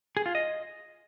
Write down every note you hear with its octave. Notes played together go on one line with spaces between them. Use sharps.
G#4
F4
D#5